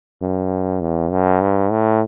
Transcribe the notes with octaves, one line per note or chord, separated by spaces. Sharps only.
F#2
E2
F#2
G2
A2